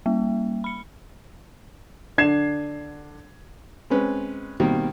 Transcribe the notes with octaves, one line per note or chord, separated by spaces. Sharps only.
G3 A#3
B5 C#7
D3 D4 G#6 C7 E7
G#3 C4 C#4 B4
B2 D#3 G3 A#3 C4